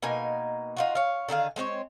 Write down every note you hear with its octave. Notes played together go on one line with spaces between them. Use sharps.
B2 A#3 D#4 G#5
D#4 F4 F#4
C#5 F5
D3 D#3 G#4 F5
G#3 C4 C5 C#5